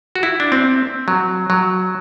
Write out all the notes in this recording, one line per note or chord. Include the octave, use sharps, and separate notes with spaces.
F#4
E4
D4
C4
F#3
F#3